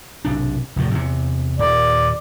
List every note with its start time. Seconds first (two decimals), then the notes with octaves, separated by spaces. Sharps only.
0.25 B1 C3 D4
0.76 F1 E2 A2
0.91 E2 C3
1.59 D#1 D5